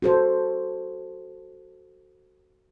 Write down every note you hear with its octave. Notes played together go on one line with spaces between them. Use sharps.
F#4 A4 C5